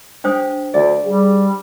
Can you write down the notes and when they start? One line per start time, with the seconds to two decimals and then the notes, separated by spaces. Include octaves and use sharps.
0.24 D4 G4 C5 D#6
0.74 D2 D5
1.05 G3 G#4